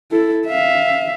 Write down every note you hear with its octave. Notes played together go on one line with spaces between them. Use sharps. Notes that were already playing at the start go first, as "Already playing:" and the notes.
E4 A4
E5 F5